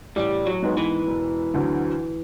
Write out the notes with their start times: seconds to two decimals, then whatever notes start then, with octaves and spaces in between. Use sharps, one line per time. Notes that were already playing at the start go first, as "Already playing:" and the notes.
0.16 A1 G3
0.46 F#3
0.62 G#2 D#3 G#3 B3
0.77 E3
1.07 E1
1.54 D2 D3 F#3